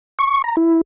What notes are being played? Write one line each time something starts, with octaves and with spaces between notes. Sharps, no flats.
C#6
A#5
E4